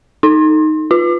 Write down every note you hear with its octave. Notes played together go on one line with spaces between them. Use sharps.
D#4
F4